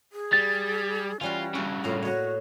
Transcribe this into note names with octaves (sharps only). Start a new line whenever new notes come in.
G#4
G3 A6
E3 G3 C#4 F4 F#4
G2 C#3 E4 F#4
A2 A#3 F4 A#5
F#4 C#5 D#5